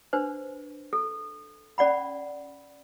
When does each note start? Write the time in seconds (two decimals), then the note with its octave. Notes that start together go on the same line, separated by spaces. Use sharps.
0.13 D4 B4 C5
0.93 A4
1.78 C#4 D5 F#5 B5